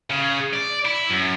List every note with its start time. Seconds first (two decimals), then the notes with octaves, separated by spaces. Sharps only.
0.10 C#3
0.53 D5
0.85 E4
1.10 F#2